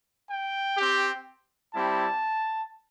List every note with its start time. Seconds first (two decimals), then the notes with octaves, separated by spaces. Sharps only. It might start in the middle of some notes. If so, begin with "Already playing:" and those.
0.29 G5
0.78 C4 G4
1.74 G3 C4 E4 G4 A5